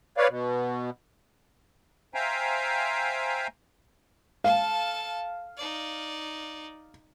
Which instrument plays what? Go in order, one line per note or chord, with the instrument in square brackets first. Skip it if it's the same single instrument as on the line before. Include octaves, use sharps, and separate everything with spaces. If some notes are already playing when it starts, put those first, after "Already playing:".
[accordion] B4 C#5 D5 F5
B2
C5 E5 F5 G5 G#5 A#5
[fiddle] A4 A5 [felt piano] F5
[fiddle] D#4 D5